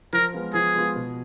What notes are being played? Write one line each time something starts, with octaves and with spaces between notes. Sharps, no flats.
F3 A#4
G#3 B3 F4
F3 G#4
G#3 B3 F4
B2